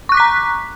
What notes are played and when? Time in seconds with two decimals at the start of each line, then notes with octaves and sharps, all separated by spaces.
0.09 C#6
0.12 F#6
0.15 D6
0.17 B6
0.20 A#5